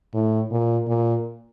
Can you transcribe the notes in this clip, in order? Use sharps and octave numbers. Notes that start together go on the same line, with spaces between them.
A2
A#2
A#2